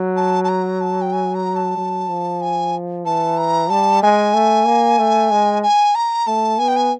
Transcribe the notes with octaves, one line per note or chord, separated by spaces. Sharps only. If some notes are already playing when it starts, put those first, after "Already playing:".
Already playing: F#3
A5
A5
A#5
A5
G5
G#5
A#5
A5
F#3
F3
G#5
E3 A5
A#5
G3 A5
G#3 G#5
A3
A#3
A3
G#3
G#5
A#5
A3 A5
B3 G#5
G5
G#5